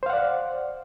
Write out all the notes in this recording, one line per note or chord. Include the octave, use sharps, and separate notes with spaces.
C5 D5 F5 F#5